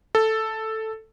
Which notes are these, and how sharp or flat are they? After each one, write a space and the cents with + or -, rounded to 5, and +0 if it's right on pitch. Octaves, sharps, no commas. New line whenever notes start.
A4 +0